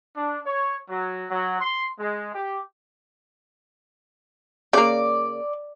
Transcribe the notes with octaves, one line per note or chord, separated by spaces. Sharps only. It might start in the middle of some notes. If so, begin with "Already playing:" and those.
D4
C#5
F#3
F#3
C6
G#3
G4
C#3 A#3 D5